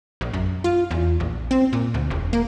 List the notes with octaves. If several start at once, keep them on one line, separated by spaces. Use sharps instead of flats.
A#1
F#2
F4
E2
A#1
C4
A#2
D2
E1
A#3